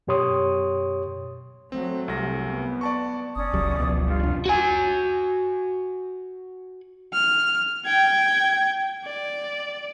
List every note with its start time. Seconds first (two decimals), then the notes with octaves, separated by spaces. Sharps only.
0.07 F#2 B2 G4 C#5 C6 D#6
1.72 F#3 A3 C4
2.08 C2 A#6
2.47 B3
2.81 D5 A5 C#6
3.36 F#1 C#4 D5 D#6
3.53 F#1 C#2 C#3 F#3
3.80 C#2 B2 F3
4.07 G2 F4
4.23 F1 D4
4.46 F#4 G#5
7.13 F6
7.85 G5 G#6
9.05 D5